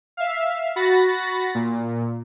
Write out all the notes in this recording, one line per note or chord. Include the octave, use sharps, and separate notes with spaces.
E5 F5
F#4 B5 A6 A#6
A#2